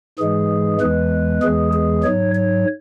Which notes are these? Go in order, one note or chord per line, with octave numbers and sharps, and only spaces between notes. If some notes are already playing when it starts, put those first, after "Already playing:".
G#2 E3 G#3 G#4
E2 E3 G#3 B4
E2 E3 G#3 G#4
G#4
G#2 F#3 C#5
C#5